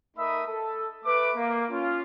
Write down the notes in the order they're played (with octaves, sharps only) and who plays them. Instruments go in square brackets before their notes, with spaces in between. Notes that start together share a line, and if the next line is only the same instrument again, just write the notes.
[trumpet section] A3 D#4 A#4 E5 B5 D#6
A4
A3 B4 D6
A#3
C#4 F4